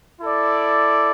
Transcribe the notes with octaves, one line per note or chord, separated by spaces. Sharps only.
E4 A4 D5